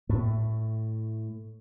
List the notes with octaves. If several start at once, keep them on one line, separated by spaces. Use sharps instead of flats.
A2 A3